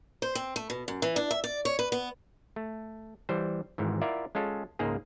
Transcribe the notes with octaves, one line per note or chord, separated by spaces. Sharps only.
C5
C4
A3
B2
F#2
E3
D4
E5
D5
C#5
B4
B3
A3
E3 G3 C5
G#1 G#2 E3
E4 F4 A#4 D5 E5 F#5
G#3 C#4 F4 A4
C#2 G#2 A#3 G#4